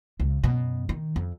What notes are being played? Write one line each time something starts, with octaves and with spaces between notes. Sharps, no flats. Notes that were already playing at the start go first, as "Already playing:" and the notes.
C#2
F#2 B2
D#3
F2